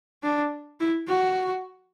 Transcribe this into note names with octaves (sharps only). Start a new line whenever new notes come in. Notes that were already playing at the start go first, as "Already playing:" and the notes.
D4
E4
F#4